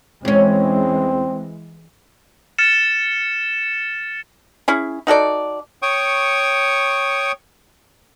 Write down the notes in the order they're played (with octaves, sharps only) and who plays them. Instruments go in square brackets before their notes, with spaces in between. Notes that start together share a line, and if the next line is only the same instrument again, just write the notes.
[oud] E2 C#4 [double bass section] E3 G#3 [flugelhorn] C4
[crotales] F6 A6 C#7 E7
[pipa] C#4 E4 G#4
D#4 F#4 A4 D5
[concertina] C#5 G5 C#6 D#6